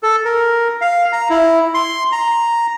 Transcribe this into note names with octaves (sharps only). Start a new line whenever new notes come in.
A4
A#4
F5
A#5
E4
C6
A#5